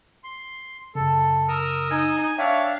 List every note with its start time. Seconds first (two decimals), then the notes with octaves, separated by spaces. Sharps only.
0.24 C6
0.95 F#2 C#3 A4
1.49 A#4 D#6 E6
1.91 D#4 G#5
2.38 D4 C#5 E5 F5 G5